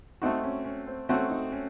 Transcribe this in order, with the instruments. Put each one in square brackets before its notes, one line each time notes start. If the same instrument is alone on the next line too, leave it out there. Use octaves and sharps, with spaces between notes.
[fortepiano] A3 C4 F#4 [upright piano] D#4
[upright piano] C#4
C#4
C4
[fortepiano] A3 C4 F#4 [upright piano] C#4
[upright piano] D#4
C#4